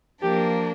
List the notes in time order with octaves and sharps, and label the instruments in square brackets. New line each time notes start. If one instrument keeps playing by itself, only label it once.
[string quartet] F3 A#3 D4 [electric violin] G4